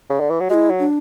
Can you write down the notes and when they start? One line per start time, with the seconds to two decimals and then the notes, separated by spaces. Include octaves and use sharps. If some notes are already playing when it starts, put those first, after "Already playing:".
0.10 C#3
0.20 D3
0.30 E3
0.40 F#3
0.50 G#3 E4 F#4
0.70 F#3
0.79 D4